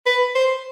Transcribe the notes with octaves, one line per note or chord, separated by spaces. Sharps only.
B4
C5